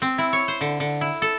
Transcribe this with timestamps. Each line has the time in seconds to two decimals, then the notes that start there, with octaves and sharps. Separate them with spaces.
0.02 C4
0.18 E4
0.33 C#5
0.48 C5
0.61 D3
0.80 D3
1.01 E4
1.22 A4